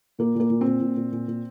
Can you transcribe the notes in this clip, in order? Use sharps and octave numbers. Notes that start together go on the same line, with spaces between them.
A#2 A#3
A#2 A#3
A#2
C4
A#2
A#2
A#2
A#2
A#2